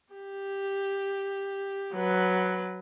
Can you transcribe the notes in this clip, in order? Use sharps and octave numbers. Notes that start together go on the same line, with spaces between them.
G4
F#3 B4